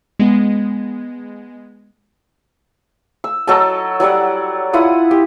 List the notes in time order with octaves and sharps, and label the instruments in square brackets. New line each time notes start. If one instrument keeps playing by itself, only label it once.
[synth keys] G#3 B3
[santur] E6
F#3 A4 D#5 A5
F#3 G3 D5 F#5
E4 F4 F#5 D#6
G4